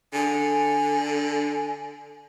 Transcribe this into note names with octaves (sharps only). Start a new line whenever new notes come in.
D3 G#5